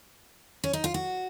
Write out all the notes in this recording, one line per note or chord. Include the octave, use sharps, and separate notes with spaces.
C#4
D#4
F4
F#4